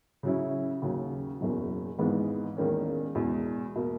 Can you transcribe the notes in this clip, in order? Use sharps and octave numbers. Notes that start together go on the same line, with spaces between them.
C#3 F#3 C#4 E4
D#2 C#3 F#3
F#1 E2 B2 F#3
G#1 G#2 E3 G#3 B3
E1 E2 D#3 A#3 C#4
E2 B2 G#3
B2 A#3